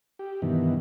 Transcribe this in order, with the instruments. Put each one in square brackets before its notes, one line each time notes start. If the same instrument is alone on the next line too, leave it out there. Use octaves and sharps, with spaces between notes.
[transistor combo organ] G4
G2 B2 D#3 E3